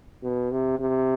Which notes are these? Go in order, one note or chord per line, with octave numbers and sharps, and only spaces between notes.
B2
C3
C3